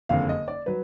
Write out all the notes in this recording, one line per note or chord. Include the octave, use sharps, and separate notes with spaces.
F#1 F2 D3 F5
D#5
D5
F#3 B4